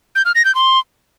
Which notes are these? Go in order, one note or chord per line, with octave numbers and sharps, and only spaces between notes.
G6
F6
A#6
G6
C6